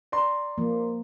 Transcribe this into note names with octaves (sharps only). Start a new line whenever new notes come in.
D5 A#5 C6
F3 A#3